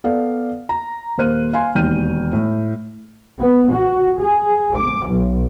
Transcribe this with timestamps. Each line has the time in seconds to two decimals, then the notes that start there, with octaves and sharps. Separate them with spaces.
0.04 B3 A4 D5 F5
0.69 A#5
1.18 D#1 A#3 C5 F6 F#6 D#7
1.53 F5 G#5 C6
1.75 E1 D#2 G5 F6 G6 D#7
2.33 A2
3.39 B3
3.70 F#4
4.18 G#4
4.76 D6
5.07 B1